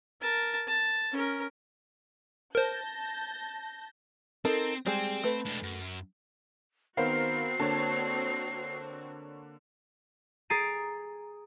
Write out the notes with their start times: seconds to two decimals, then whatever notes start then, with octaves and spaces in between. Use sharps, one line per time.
0.21 A#4 A5
0.68 A5
1.12 C#4 A#4
2.55 A#4 C5 A5 G6 A#6
4.45 C4 D#4 A4 A#4
4.86 G3 G#3 C4 G#4 C5
5.24 A3 B4
5.45 G#3 D4
5.63 F#2
6.97 D#3 B3 C4 F#4 A#4 C5 F5 C7
7.59 D3 A#3 D4 C#5 A5
10.50 G#4 A#5 A6 C7 D7 D#7